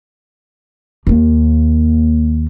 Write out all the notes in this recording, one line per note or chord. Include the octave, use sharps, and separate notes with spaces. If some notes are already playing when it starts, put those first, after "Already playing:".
D#2 A#3